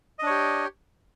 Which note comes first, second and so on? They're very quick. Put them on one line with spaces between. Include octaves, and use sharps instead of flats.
D#5 D4 C#5 G4